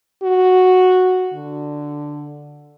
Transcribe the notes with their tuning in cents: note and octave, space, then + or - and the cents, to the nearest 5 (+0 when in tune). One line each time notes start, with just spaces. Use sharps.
F#4 -5
D3 +5